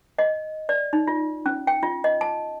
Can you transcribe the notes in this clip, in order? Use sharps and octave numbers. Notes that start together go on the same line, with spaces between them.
D#5
D5
D#4
F4
C#4
G5
F4
D#5
A5